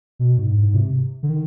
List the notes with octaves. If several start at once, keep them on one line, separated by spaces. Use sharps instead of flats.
B2
G#2
G#2
C3
D3
D#3